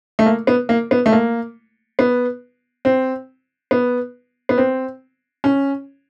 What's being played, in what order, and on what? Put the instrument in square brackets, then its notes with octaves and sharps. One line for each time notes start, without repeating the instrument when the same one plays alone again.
[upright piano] A3
A#3
B3
A#3
B3
A3
A#3
B3
C4
B3
B3
C4
C#4